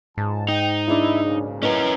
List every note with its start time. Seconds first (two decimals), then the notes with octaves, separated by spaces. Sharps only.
0.18 C#2 G#2 A5
0.48 D#4 G5
0.88 D4 E4 G#4 D#5
1.24 B1 A#2 C#3
1.63 C#4 E4 A#4 B4 D#5